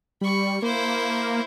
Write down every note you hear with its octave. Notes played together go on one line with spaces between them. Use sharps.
G3 B5 C#6
A#3 E4 C5